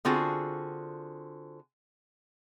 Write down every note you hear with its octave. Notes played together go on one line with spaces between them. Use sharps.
D3 C4 F4 F#4 G#4